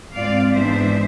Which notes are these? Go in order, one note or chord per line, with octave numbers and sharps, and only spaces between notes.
G#2 G#3 C4 F4 D5 F5
G#2 E3 G#3 B3 D4 C5 E5